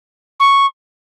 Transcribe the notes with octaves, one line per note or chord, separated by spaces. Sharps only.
C#6